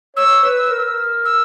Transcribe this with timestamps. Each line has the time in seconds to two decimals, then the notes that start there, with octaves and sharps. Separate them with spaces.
0.16 C#5 E6
0.43 B4
0.71 A#4
1.25 E6